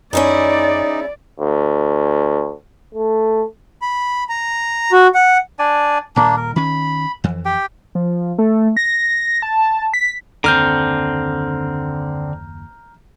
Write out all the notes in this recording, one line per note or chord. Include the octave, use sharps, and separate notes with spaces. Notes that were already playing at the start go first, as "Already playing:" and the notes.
F#2 C#4 D#4 E4 G#4 D5
D2
A3
B5
A#5
F#4
F#5
D4 D5 G#5
D#1 A#2 A#3 D4
A#4
D#3 C#4 B5
F2 E3
G4 G5
F3
A3
A#6
A5
B6
F#1 D#2 D3 C4 A#5 F6 G6